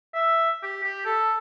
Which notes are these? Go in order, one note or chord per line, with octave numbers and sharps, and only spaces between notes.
E5
G4
G4
A4